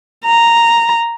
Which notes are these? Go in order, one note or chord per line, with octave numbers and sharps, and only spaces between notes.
A#5